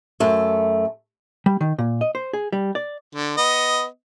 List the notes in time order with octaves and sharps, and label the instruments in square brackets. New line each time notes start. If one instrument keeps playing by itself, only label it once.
[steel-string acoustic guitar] F#2 A3
[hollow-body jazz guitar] G3
D#3
A#2
D#5
C5
G#4
G3
D5
[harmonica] D3
B3 D#5